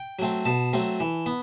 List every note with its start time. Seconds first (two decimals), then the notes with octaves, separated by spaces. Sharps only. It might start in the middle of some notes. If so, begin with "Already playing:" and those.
Already playing: G5
0.19 F#3 A3 C4
0.45 B2 A5
0.73 F#3 A3 C4
1.00 E3
1.26 B3